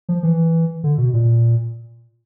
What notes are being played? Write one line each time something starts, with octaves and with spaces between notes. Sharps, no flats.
F3
E3
D3
B2
A#2